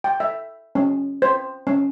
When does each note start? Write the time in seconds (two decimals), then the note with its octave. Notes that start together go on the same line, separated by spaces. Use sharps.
0.04 G5
0.20 E5
0.75 C#4
1.22 C5
1.67 C#4